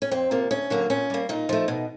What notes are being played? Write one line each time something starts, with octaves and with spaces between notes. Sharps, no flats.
C#4
F2 C4
C3 F3 A#3
D2 C#4
D3 F#3 A#3
A#2 C#4
G3 A#3
A#2 D#4
F3 A3
B2